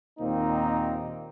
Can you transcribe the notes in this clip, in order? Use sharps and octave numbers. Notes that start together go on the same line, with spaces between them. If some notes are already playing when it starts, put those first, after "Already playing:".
D#2 A#2 D#3 A#3 C4 D#4